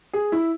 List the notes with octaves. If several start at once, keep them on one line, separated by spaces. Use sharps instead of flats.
G#4
E4